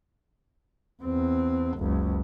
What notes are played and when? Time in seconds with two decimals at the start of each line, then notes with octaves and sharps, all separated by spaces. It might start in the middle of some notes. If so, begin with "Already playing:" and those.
1.03 E2 C4
1.78 F#1 C#2